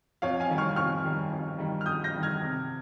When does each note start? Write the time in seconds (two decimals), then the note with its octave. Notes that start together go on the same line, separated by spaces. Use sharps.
0.22 F2 C#5 F5
0.40 F5 G#5
0.50 D#3 G3
0.58 C#6 F6
0.76 F2 C#6 F6
1.04 D#3 G3
1.32 F2
1.58 D#3 G3
1.81 F6
1.85 F2 D#6 G6
2.04 G6 A#6
2.13 D#3 G3
2.23 F6 G#6
2.41 C3